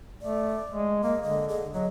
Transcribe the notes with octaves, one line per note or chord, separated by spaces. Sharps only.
A3 D5
G#3
A#3 D#5
D3 D#5
G#4
F#3 D#5